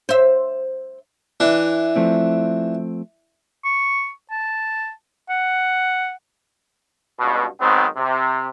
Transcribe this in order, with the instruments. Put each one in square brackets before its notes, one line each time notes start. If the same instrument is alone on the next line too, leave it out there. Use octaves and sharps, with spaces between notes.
[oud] C5 E5
[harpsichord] E3 D4
[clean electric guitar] F3 A3 C4
[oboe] C#6
A5
F#5
[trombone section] C#2 G2 B2
G#2 D#3 F#3 B3 C4
C3